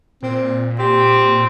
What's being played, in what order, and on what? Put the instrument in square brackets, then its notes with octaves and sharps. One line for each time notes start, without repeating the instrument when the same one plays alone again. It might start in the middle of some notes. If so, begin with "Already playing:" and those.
[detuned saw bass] A#2 [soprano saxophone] C4
[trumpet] C4 [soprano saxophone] G4